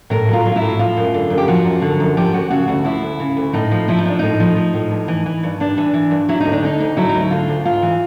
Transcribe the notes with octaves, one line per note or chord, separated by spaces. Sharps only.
A2 A#4
F#3 F4
F#3
F4
E4
A2
F3 F4
F#2
D3
F#2
G4
F3 F#4
F#2
D3
F#2
F3 G4
D2 F#4
C#3 F#4
D2 F#4
F3 E4
D2
C#3
D2
A2 D#4
F3
F3 E4
D#4
A2 D4
A2 D#4
F3
F3
A2
G2
E3
E3
G2
G2 D4
E3
E3
G2
F#3 E4
D2 D#4
D4
D3 D#4
D2
F#3 E4
D#4
D2
E4
D3 F4
D2
G#2 F4
E3